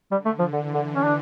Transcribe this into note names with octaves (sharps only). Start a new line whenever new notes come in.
D3 G3
A3
F3
D3 E3
D3
C#4
D4